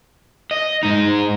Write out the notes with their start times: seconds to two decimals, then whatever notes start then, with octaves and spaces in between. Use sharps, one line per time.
0.51 D#5
0.83 G#2 D#4